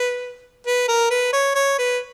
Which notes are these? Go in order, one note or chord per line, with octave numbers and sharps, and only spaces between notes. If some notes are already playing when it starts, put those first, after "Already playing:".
Already playing: B4
B4
A#4
B4
C#5
C#5
B4